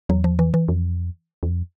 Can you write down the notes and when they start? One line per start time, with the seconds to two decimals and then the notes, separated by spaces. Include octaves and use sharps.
0.09 E2 F#3
0.24 F3
0.39 E3
0.54 E3
0.68 F2
1.43 E2
1.49 F2